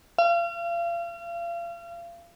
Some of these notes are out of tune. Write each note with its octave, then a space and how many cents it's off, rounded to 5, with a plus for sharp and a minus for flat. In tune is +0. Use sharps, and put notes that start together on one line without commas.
F5 -35